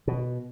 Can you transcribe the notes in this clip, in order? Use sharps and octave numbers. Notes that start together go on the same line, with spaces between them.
B2